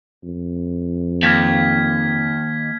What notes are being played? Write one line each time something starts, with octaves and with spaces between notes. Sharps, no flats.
F2
D#2 F6 G#6 B6